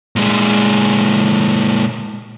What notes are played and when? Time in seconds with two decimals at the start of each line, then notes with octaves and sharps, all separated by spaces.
0.16 A#2 G#3